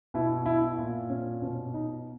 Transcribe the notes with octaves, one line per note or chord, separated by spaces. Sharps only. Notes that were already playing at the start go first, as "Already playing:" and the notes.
B2 E4
E4
A#2
C#4
B2 C#4
D#4